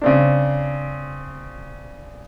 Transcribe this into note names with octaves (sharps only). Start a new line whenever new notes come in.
C#3 C4 D4